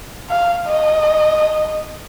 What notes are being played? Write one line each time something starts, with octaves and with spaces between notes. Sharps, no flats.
F5
D#5